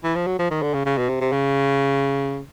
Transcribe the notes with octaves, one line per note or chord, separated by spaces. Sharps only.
E3
F3
F#3
F3
D#3
D3
C#3
C#3
B2
C3
C3
C#3